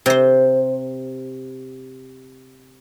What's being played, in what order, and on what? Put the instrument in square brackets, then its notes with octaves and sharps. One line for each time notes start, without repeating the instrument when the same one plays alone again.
[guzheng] C3 C5